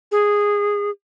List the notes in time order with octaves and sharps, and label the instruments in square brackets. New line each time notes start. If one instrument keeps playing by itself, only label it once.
[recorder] G#4